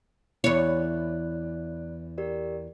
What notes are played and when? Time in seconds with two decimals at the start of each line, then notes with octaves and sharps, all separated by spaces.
0.44 E2 E4 C#5 D5 F#6
2.18 G4 A#4 D5